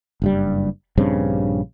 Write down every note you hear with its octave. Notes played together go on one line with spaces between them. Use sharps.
F#1 G2 G3
A#1 G2 C#3 C4